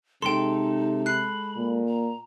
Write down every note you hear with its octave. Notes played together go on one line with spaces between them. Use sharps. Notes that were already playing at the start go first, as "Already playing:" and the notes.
C3 G#3 D#4 A4 G5 C6
B5 F#6 C7
A#2
A#5